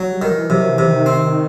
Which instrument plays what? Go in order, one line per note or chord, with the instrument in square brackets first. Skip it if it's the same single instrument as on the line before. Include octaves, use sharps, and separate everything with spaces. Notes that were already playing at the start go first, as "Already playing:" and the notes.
Already playing: [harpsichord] F#3
[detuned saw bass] G3
[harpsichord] D#3
[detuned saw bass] E3
[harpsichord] C3 [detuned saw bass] F#3
[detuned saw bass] E3
[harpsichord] C3
[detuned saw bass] D#3
[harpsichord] C4